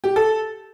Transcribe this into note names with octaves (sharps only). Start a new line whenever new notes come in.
G4
A4